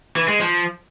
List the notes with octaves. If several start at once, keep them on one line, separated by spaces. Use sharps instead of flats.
E3
G#3
F3